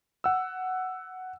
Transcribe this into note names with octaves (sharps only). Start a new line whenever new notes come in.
F#5 E6